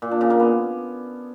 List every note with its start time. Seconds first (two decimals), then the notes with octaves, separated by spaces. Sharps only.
0.02 A#2
0.11 D4
0.21 C#3
0.30 A#3
0.40 B3